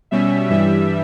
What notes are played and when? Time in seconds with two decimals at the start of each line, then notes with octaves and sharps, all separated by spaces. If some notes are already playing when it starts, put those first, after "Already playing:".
0.11 B2 G3 C#4 E5
0.50 G2 E3 G3 E5